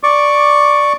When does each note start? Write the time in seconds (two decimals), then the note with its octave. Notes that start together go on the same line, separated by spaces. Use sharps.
0.03 D5 C#6 D6